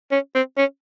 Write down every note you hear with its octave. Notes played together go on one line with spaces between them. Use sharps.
C#4
C4
C#4